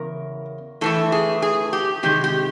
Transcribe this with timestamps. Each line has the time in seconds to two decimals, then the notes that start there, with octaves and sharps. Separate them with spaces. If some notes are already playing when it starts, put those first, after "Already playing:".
Already playing: E2 C#3 A#4
0.81 A2 E3 A3 A4
1.12 G#4
1.42 G#4
1.73 G4
2.03 C3 D#3 G#3 G4
2.24 G4